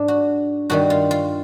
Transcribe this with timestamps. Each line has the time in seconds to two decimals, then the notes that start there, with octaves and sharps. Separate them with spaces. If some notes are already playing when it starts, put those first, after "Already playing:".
Already playing: G#2 D4
0.08 F#4
0.70 G2 D#3 G3 F#4
0.90 F4
1.11 F4